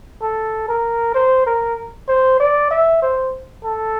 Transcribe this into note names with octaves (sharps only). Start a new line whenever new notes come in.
A4
A#4
C5
A#4
C5
D5
E5
C5
A4